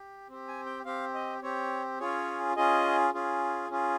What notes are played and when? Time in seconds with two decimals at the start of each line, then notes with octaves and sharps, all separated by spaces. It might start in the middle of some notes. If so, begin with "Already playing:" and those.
Already playing: G4
0.29 C4 G4
0.48 G#5
0.66 G5
0.85 C4 G4 F5
1.14 D#5
1.42 C4 G4 C#5
2.00 C#4 F4 G#4 C#5
2.56 C#4 F4 G#4 D#5
3.14 C#4 F4 G#4
3.70 C#4 F4 G#4